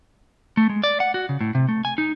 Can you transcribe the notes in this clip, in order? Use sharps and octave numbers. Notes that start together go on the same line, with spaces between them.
A3
G#3
D5
F#5
F#4
C#3
A2
C3
A3
G#5
D#4